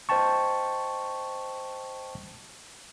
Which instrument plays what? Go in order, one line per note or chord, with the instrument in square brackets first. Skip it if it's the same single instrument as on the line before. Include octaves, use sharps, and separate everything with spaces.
[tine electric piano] C5 D#5 G5 A5 C#6